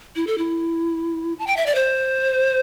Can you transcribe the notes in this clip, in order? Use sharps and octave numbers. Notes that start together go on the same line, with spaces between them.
E4
A4
E4
A5
G5
E5
D5
C5